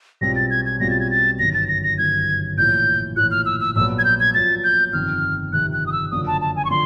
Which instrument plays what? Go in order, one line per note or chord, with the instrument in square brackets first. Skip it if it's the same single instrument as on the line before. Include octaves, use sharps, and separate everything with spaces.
[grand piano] B1 B2 G3 C4 F4 [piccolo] A#6
[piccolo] A6
G#6
G#6
[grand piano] B1 B2 G3 C4 F4 [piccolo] A#6
[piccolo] A6
G#6
A6
[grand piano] G1 F#2 D#3 [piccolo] A#6
[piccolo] A6
A#6
A#6
[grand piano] G1 F#2 D#3 [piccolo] G#6
[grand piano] A#1 A2 E3 [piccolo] G6
[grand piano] A#1 A2 E3 [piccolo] F#6
[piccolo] F6
E6
E6
[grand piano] A#1 A#2 F#3 B3 [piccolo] E6
[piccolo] G#6
G6
G#6
[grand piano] A#1 A#2 F#3 B3 [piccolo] A6
[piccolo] G6
[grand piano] G1 F2 C3 D#3 [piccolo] F6
[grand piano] G1 F2 C3 D#3 [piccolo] F#6
[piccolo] F#6
D#6
E6
[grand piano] F#1 F#2 D3 F3 [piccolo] D#6
[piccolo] A5
A5
G#5
C#6
[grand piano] D3 F3 [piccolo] C6